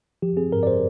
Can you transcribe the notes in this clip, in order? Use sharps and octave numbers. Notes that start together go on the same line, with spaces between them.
F3 G4
C4 G#4
G#2 A#4
D5
C5